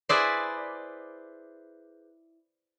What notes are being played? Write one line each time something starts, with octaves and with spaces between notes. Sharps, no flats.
E4 G#4 B4 C5 D5